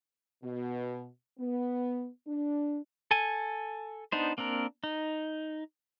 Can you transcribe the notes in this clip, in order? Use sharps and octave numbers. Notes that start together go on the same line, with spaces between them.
B2
B3
D4
A4 G#5
B3 D4 D#4 C5
A#3 C4 D4 A#4
D#4